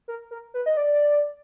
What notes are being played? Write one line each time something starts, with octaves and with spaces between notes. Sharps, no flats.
A#4
A#4
B4
D#5
D5